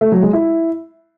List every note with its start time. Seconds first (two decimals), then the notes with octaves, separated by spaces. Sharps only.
0.01 A3
0.12 F#3
0.23 G#3
0.33 E4